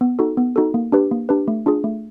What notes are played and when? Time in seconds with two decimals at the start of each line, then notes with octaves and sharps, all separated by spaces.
0.01 B3
0.19 D#4 F#4 A4
0.37 B3
0.56 D#4 F#4 A4
0.74 A#3
0.92 D4 G4 B4
1.11 A#3
1.29 D4 G4 B4
1.48 A3
1.66 D4 F4 G#4
1.84 A3